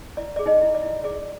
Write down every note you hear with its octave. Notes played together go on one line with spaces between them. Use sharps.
E4 D5
G#4 D5
D#4 D#5
E4
D5
E4
G#4 D5